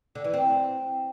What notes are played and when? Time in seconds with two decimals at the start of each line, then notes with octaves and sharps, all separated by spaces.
0.15 D3
0.24 E3
0.33 C4